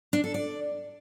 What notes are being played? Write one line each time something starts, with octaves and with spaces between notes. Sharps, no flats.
D4
A4
D5